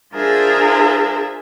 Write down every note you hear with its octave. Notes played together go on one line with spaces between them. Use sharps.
D4 F4 G#4 A#4 C5 E5